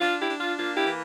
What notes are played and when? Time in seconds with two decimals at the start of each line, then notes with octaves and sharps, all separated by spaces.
0.01 D4 F4
0.19 E4 G4
0.29 D4
0.38 F4
0.57 A#3 F4
0.76 E4 G4
0.85 E3